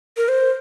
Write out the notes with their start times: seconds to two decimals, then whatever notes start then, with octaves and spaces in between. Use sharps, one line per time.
0.17 A#4
0.28 C5